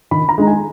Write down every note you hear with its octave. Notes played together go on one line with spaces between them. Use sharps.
D#3 B5
A#5
G#3 D#4
G#5